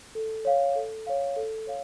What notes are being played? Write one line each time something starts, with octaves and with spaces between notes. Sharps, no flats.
A4
C#5 F5
A4
C#5 F5
A4
C#5 F5